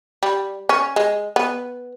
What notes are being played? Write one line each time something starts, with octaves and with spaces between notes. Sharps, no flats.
G3
C#4
G#3
B3